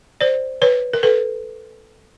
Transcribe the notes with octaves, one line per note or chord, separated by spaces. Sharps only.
C5 D5
B4 C#5
A#4
A4 B4